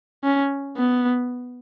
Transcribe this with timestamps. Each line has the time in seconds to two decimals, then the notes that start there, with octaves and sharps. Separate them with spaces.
0.24 C#4
0.77 B3